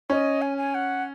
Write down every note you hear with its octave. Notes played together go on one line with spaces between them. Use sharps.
C#4 D#5
G#5
G#5
F#5